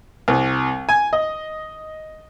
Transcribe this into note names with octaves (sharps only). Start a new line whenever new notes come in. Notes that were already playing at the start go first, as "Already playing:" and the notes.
C2
G#5
D#5